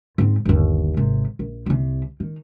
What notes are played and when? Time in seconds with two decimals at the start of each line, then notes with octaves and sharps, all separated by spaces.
0.18 G#2 C4
0.45 G1 D#2
0.97 G#1 C3
1.39 A#1
1.66 C2 C3
2.20 D#3